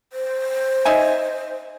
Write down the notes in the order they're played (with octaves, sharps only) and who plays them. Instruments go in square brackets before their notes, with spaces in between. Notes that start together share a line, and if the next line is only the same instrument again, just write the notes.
[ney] C5
[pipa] D#4 E5 G#5